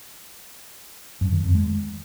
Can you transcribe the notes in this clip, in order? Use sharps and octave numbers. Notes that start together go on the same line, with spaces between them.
F#2
D#3
F2
G#3